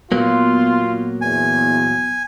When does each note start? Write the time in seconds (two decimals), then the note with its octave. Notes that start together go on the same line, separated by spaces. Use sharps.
0.12 A#2 F#3 A#3 B3 F4
1.21 E2 G#5